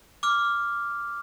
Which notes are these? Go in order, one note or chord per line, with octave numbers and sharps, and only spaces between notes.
D6 F6